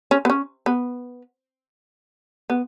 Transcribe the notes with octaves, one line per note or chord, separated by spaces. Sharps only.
C#4
B3
C#4
B3
B3